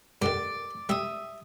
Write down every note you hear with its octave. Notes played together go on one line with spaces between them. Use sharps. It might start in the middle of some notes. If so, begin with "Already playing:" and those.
G2 D3 D#3 D5
G3 E5 D#6